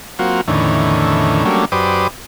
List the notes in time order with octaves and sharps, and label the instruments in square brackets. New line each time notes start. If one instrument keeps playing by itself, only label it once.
[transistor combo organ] F#3 A#3 C4 F4 F#4
E2 A2 D3 D#3 C#4
F#3 G3 A3 A#3 C#4 D4
F#2 G4 B4 C5 D5 D#6